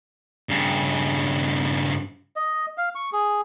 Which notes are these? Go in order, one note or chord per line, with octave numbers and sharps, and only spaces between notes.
G2 C#3
D#5
F5
C#6
G#4